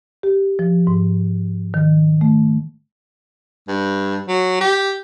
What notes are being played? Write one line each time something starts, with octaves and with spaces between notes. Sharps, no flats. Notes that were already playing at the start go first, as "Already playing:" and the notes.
G4
F3
G#2
D#3
A3
G2
F#3
G4